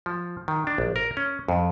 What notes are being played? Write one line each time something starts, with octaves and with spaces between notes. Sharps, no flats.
F3
D#3
D4
A#1
A#4
C#4
F2